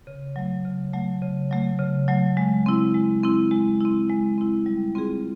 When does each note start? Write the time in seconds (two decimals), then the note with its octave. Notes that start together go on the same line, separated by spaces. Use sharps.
0.07 C#3
0.36 F#3 A3
0.65 C#3
0.93 F#3 A3
1.22 C#3
1.51 F#3 A3
1.79 C#3
2.08 F#3 A3
2.37 G#3
2.66 C4 E4
2.95 G#3
3.23 C4 E4
3.51 G#3
3.81 C4 E4
4.09 G#3
4.38 C4 E4
4.66 G3
4.95 C4 F4 G#4